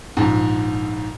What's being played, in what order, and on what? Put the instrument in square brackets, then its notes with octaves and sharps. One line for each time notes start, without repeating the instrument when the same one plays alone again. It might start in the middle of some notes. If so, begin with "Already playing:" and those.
[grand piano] A#1 G#2